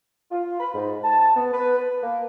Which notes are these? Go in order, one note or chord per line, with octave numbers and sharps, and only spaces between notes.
F4
B5
G#2
A5
B3
B4
B4
A#3